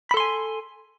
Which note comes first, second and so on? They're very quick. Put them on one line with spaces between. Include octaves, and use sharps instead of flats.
B5 A4 C6 G#5